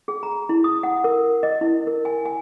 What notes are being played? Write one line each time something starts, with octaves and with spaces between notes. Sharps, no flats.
G#4
A#5
E4
D#6
F#5
A#4
D#5
E4
A#4
G#5
G#5